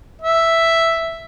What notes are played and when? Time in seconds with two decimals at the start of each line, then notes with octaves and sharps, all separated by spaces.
0.22 E5